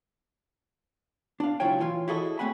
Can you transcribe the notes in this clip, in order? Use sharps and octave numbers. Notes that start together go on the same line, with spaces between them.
D4 F5
C#2 F#3 E4 F4 C#5 G5
E3 F4 C#5
E4 F#4 G#4 A4 C#5 D#5
A3 C4 C#5 F#5 G#5 B5